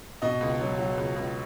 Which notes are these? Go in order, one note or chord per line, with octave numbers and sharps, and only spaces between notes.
B2 D#5
C#2
F#3
F#3
C#2
C#2